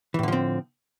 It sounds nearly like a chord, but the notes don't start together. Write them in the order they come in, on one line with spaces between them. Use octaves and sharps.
E3 A2 D3 F3 C4